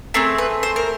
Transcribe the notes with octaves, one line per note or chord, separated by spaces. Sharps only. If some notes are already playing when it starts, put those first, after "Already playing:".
A3 C4 G#4 A#4
B4
C5
A#4